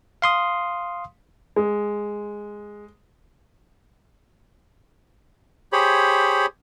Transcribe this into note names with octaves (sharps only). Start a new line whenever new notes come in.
F5 C6 D#6
G#3
G4 G#4 C5 C#5 B5